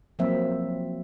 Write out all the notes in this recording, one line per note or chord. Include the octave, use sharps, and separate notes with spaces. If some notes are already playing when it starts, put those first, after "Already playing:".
F3 F#3 A#3 C4 E5